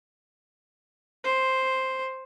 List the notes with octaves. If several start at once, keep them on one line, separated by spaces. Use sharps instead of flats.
C5